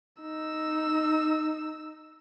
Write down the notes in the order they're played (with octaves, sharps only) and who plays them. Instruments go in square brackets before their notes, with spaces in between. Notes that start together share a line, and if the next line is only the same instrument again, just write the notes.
[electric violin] D#4 E6